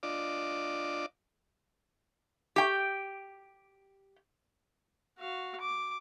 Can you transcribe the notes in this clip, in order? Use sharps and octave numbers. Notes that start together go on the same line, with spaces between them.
D4 F4 D5 D#5 D6
G4 G5
F#4 F5
D6